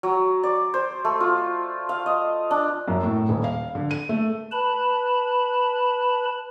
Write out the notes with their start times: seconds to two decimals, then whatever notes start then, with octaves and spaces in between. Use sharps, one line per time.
0.03 F#3
0.43 D5
0.74 C5
1.05 A3
1.20 F4
1.89 F5
2.06 D#5
2.51 D4
2.88 F#2
3.03 A2
3.29 D#1
3.44 F5
3.75 D3
3.91 D#7
4.09 A3
4.51 B4 A5 B5